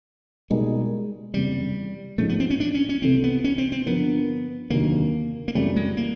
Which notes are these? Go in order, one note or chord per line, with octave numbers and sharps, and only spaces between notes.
B2 G3 G#3 A#3 D#4 G#4
F#1 E2 C3 G3
A1 G#2 F3 G#3 A3 C#4
B3
C4
C#4
D4
C#4
C#4
C2 C3 E3 A3 C4
B3
C#4
C4
C4
G2 D3 F3 A#3 B3
F1 D#2 D3 F#3 A#3
A#3
F#2 C#3 E3 G3 A3 C4
G#3
A#3